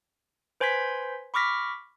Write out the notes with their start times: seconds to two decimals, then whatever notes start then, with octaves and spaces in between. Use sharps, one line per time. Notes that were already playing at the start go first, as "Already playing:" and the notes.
0.60 B4 C5 G#5 C6 G#6 B6
1.34 B5 C#6 D6 F6 A#6 B6